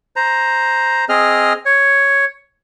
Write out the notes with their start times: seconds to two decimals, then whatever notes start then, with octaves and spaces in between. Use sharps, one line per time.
0.16 C5 A#5
1.09 C4 G#4 D#5 F6
1.66 C#5